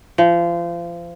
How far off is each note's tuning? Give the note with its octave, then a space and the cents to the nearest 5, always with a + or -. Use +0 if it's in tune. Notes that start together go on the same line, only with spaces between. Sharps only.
F3 -30